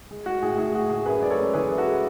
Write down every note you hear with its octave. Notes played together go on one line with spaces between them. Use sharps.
G#3
G#3 F#4
A2 G#4
A2 G#4
A2 F#4
A2 G#4
F#2 G#4 B4
G#3 D5
A4 C#5
F#2
E3 G#4 B4
G#3
F#4 A4
G#3